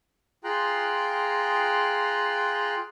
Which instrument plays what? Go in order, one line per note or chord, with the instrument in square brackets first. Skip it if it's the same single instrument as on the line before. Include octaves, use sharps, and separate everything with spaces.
[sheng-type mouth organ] F4 G#4 G5 A#5 C6 F#6